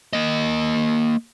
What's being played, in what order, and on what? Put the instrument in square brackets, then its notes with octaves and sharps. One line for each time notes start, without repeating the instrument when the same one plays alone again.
[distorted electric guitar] A#3 D#5